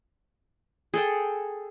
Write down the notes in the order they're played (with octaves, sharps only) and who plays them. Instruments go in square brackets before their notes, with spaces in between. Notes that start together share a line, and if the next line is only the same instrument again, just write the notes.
[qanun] G#4 A4 G5